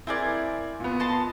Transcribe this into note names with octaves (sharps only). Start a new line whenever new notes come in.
C4 E4 G#4 A#4 D5
A#2 B3
D#5 A5 C6